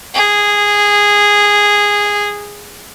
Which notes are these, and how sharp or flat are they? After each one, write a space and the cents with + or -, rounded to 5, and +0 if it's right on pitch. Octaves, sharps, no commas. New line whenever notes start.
G#4 -10